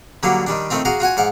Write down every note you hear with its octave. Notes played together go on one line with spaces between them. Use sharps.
D3 F#3 G3 A#3 D4
D#3 G3 D4
D#3 A3 C4 F4
F#4 G#4 F5 A#5 D6
F4 F#4 F#5 G#5
G#2 F5 F#5 D6